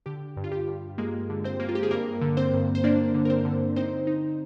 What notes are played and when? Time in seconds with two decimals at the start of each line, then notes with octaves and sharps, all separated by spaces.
0.06 D3 G4
0.37 G2
0.44 F4
0.52 G4
0.67 G2
0.98 G#3 A#3 G#4
1.29 D3
1.44 C4 C5
1.60 A#3
1.69 F4
1.75 G4
1.83 G#4
1.91 G2 A#3 A#4
2.22 D3
2.37 C4 C5
2.54 G2
2.75 C5
2.84 A#3 D4 D5
3.14 D3
3.25 A#4
3.30 C4 C5
3.45 D3
3.76 C4 D#4 C5
4.07 D#4